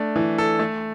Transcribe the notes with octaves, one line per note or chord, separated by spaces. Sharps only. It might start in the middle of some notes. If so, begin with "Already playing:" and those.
Already playing: A3 D4
E3
A4
A3